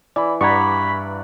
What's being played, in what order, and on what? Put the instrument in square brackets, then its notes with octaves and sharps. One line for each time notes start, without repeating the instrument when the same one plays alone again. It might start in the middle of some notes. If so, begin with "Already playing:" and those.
[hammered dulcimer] E3 [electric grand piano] D5 B5
[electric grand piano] G2 [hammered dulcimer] D5 F#5 A#5 [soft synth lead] B5 [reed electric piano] C#6 G#6